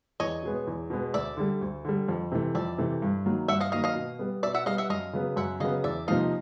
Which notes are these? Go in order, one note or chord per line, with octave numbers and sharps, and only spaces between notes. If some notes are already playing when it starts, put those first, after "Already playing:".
E2 C#5 D#5
B2 G#3 B3
E2
B2 G#3 B3
D2 D5 E5
D3 G3
D2
D3 G3
F2
C3 E3 A3
F2 D5 E5
C3 E3 A3
G2
D#3 F#3 A#3
G2 E5 F#5
D#5 F5
D#3 F#3 A#3 D#5 F5
D#5 F5
B2
G3 B3
B2 D5 E5
E5 F#5
G3 B3 D#5 F5
E5 F#5
F#2 D#5 F5
C#3 F#3 B3
F#2 E5 F#5
C#3 F#3 B3 D#5 F5
E2 D5 E5
C3 F3 A#3 D#4 D#5 F5